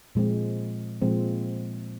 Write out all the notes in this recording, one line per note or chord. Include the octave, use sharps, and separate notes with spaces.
A#2 F3 G#3 C4
A#2 F3 G#3 C4